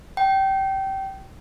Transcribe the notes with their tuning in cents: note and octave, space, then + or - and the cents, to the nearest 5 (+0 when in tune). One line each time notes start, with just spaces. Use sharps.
G5 -20